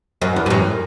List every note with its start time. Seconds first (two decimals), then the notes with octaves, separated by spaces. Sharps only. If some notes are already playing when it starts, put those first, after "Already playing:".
0.22 F#2
0.36 E2
0.46 G2
0.50 F#2